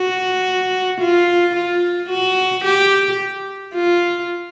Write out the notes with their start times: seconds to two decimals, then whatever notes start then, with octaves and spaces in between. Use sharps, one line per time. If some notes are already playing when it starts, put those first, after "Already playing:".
Already playing: F#4
1.01 F4
1.56 F4
2.10 F#4
2.65 G4
3.74 F4